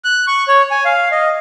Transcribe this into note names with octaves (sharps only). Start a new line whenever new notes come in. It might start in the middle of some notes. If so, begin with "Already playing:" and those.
F#6
C#6
C#5
G#5
F5
D#5